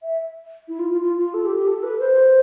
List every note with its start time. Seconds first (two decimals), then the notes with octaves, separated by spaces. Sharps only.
0.03 E5
0.68 E4
0.79 F4
0.90 F4
1.01 F4
1.18 F4
1.34 A4
1.45 G4
1.56 G4
1.67 A4
1.83 B4
1.99 C5